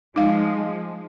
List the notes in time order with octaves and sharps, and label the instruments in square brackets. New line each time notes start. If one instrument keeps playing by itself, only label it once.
[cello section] F3 G#3 [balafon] D#4 F5